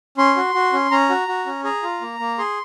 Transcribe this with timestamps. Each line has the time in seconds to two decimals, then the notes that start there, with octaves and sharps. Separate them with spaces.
0.18 C#4 C6
0.36 F#4
0.54 F#4
0.73 C#4
0.91 C#4 A#5
1.09 F#4
1.28 F#4
1.46 C#4
1.64 G#4 A#5
1.83 F4
2.01 A#3
2.20 A#3
2.38 G#4 C6